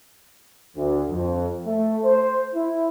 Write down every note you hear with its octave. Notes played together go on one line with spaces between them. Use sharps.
D2
F2
A3
C5
E4